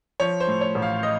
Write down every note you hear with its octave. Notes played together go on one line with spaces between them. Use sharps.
F3 C#5
C5
A2
C#5
A1
F5
D#5